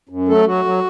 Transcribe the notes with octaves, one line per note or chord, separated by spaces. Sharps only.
F#2
F#3 A3 A4
F#3 F#4
F#3